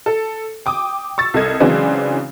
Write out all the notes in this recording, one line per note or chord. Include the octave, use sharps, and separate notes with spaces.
A4
G5 D6 D#6
C#6 E6 A6
C2 A4 D#5 G#6
C#3 E3 F#3 G#3 C4 D4